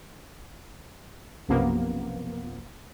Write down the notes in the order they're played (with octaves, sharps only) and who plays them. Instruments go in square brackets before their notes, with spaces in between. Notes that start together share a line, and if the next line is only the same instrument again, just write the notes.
[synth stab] B1 F#2 C3 F3 A#3 B3